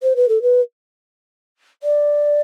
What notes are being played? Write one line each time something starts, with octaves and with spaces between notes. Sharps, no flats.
C5
B4
A4
B4
D5